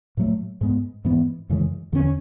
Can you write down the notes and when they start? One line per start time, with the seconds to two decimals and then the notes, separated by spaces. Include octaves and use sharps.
0.17 A2 F#3 A3
0.61 G#2 G#3 B3
1.05 G#2 E3 B3
1.50 F#2 C#3 E3 G#3
1.92 E2 D3 A3 C#4